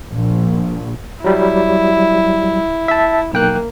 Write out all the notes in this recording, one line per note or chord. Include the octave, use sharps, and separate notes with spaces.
A#1
F#3 G3 E4
E5 A5
B1 A#3 G5 F#6